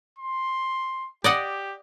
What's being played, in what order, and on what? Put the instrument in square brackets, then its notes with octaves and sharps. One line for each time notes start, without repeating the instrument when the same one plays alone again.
[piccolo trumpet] C6
[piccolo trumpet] G4 [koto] D5 D#5 F#5